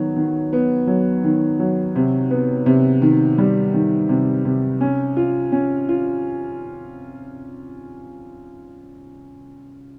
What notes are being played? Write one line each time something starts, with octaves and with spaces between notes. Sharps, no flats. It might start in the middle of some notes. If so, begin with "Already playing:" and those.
Already playing: D#3 F#3 B3
D#3
B3
F#3
D#3
F#3
C3
B3
C3
D#3
G3
D#3
C3
C3
C#4
F4
C#4
F4